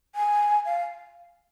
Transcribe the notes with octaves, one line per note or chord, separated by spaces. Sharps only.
G#5
F5